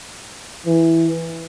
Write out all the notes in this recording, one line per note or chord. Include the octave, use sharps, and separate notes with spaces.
E3